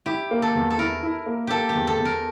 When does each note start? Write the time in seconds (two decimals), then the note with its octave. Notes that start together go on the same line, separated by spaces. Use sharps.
0.06 E4 G4
0.31 A#3
0.42 A4
0.55 E2
0.70 A4
0.78 E4 A#4
1.03 E4
1.26 A#3
1.47 A#3 G4 A4
1.69 G4
1.75 E2
1.87 A4
1.99 E2
2.05 A#4